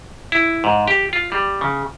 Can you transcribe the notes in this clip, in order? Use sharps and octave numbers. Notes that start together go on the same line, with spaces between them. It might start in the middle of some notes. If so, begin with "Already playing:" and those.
E4
G#2
G4
F4
G3
C#3